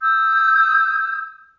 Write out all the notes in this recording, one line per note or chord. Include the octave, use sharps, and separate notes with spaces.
D#6 E6 G6